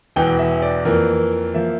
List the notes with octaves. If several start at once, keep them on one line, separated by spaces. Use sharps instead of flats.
E1 E2 E3 G5
E5
D5
F2 E3 A#3 A#4
F3 A#3 E5